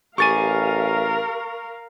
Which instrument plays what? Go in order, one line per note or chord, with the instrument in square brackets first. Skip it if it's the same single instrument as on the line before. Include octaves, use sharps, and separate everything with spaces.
[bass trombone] A1 [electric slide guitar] G4 G#5 [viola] A#4 F5 [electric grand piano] C#6 A6 D#7